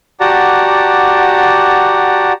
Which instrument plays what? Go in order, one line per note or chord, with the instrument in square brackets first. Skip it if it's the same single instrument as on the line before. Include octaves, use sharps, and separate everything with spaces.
[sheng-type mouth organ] F#4 G4 D5 F#5 A5 A#5